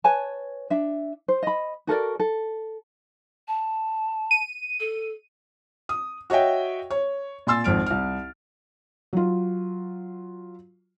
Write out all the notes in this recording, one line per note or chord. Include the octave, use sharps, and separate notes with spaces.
B4 C#5 G#5 A5
D4 E5
C5
D#5 B5
F#4 A4 A#4 D5
A4
A5
D#7
A4
D#6
F#4 C#5 D#5 E5 G5
C#5
A#2 G#5 C6 E6 A6
G#1 F2 F6 D7
C2 F6
F#3 F4